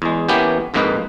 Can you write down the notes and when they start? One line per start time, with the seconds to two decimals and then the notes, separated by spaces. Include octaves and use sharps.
0.02 E2 G#3
0.28 E3 A#3 B3 C#4 G4
0.74 A#1 F2 G#2 A#3 D#4 B4